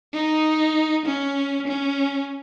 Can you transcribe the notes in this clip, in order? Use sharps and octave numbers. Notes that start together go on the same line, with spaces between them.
D#4
C#4
C#4